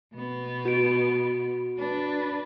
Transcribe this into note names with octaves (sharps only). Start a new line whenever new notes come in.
B2 B3
F#4 D7
D4 B4